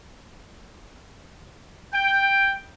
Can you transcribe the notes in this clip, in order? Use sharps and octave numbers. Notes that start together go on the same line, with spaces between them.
G5